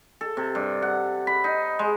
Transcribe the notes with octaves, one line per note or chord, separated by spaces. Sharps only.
A4
C3
G2
F#5
B5
D#4
G#3